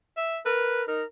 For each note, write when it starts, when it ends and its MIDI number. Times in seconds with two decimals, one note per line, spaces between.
0.17 0.39 76
0.45 0.86 70
0.45 0.82 71
0.88 1.02 63
0.88 1.04 70